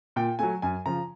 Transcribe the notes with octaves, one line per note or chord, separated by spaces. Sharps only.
A#2 G5
F#3 A3 G#5
F#2 G#5
C#3 F3 A#5